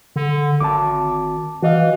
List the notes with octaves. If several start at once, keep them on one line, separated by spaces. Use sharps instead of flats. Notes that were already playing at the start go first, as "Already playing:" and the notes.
D3
G#1 A5 D6
E3 F#4 D#5 F5